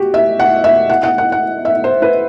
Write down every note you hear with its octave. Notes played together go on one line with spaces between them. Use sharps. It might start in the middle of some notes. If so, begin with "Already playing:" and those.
Already playing: F#4 G4
E5
F#5
E5
F#5
F#5
F#5
F#5
E5
C5
B4